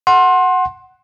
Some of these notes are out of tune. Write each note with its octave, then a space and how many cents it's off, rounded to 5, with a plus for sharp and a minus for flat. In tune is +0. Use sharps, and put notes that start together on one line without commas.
F#5 +0 C6 +20